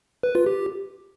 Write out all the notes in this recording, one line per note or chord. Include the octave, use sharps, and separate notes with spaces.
B4
F4
G4